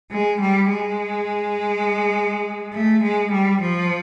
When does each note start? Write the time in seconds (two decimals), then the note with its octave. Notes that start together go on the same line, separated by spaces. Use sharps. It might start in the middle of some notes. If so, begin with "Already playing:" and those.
0.11 G#3
0.40 G3
0.69 G#3
2.73 A3
3.03 G#3
3.31 G3
3.61 F3